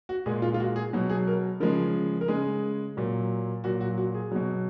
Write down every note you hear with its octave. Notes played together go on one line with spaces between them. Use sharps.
F#4
A#2 G#3 G#4
F4
F4
F#4
G#4
B2 F#3
G#4
A#4
C#3 F3 G#3 A#4
A#4
C#3 G#3 G#4
A#2 F#3
A#2 F#3 F#4
F#4
F#4
G#4
B2 F#3